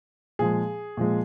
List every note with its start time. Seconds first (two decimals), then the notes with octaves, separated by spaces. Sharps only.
0.39 A#2 F3 G#3 G#4
0.97 A#2 F3 G#3